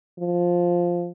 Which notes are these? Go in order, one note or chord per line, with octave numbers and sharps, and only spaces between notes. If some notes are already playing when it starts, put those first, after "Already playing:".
F3